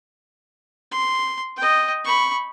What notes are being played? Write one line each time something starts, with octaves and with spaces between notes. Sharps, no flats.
C6
D#5 G5
B5 C#6